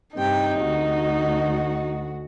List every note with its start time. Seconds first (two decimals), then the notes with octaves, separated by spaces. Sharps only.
0.16 G2 C3 D#4 G5
0.59 D2 F#4